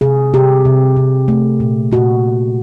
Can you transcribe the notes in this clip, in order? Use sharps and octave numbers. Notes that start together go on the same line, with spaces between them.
C3 G#4
C3 G4
C3
C3
A3
A#2
A#2 F#4